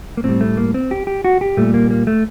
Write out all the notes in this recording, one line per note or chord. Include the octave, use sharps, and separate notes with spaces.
A#3
A2 G3 C4
A3
A#3
C4
G4
G4
F#4
G4
A#2 G3 A3
A#3
A#3
A3